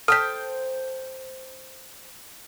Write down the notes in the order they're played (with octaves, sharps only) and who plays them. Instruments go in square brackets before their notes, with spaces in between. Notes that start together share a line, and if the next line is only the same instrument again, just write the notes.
[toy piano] A4 [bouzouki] C5 G5 A5 [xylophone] F6 B6